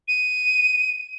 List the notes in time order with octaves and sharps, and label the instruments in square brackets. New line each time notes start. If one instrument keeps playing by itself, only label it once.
[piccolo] D#7